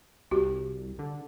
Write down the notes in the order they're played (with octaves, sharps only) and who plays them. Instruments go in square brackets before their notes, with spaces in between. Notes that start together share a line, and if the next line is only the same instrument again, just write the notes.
[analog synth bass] C2 [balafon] F#4 G4
[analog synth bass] D3